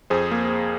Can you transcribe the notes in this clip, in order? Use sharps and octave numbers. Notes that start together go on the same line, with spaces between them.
F2 G#4 C5
A#3